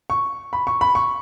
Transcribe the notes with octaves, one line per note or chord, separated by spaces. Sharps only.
C#6
B5
C#6
B5
C#6